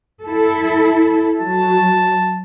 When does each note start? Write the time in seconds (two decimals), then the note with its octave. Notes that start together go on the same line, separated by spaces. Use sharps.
0.23 E4 A4
1.40 F#3 A5